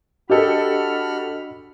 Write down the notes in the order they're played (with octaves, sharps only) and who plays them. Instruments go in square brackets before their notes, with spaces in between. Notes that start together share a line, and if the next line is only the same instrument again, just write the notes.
[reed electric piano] D4 D#5 [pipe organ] F#4 B5 F6 [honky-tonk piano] G4 A4